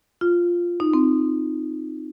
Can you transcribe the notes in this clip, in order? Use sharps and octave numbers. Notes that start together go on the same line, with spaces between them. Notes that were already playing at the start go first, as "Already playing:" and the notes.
F4
D#4
C4